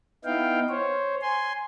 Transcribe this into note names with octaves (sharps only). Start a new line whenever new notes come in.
B3 D#4 E4 F5 G5
C5 C#5
G#5 C6